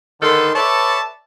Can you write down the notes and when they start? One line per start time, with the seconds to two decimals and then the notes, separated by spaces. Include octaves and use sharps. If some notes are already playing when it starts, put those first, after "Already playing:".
0.21 G#2 D3 D#3 A4 B4 C6
0.55 A4 B4 C#5 D5 E5 A5